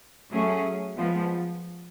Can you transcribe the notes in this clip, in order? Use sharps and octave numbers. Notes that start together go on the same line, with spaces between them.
F#3 A3 C#4 G#4
F3 G#3 B3